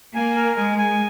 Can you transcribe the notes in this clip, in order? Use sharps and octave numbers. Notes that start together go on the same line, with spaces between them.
A#3 G#5
A#4
G#3 G#5
G#5